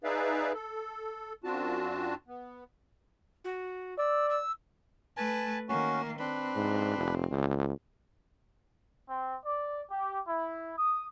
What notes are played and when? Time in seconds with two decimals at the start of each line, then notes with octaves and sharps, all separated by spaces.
0.04 D#4 G#4 B4 D5 E5 F5
0.54 A4
1.44 F#2 C4 D4 F4 F#4 A5
2.27 B3
3.44 F#4
3.98 D5 E6
4.29 E6
5.17 A3 B4 G#5 A5
5.69 D#3 A#3 C#4 F#4
6.19 C4 D4 B4 B5
6.56 G#2
6.98 F1
7.30 C#2
9.07 C4
9.46 D5
9.90 G4
10.27 E4
10.77 D#6